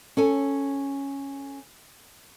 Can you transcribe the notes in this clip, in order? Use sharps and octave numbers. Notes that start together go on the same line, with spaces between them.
C#4 A4 G#5